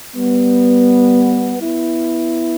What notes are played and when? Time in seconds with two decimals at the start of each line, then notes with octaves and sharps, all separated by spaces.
0.15 G3 B3
1.60 B3 E4